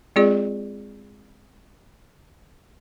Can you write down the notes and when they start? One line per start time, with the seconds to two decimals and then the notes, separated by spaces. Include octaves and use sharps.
0.16 G#3 C4 F4 G#4 D5